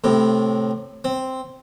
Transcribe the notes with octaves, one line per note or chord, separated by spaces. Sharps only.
A2 C3
C4